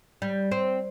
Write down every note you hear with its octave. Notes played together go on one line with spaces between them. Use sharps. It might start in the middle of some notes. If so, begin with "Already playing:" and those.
G3
C4